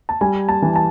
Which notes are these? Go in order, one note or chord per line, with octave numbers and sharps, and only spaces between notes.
A5
G3 G#5
A5
E3
A5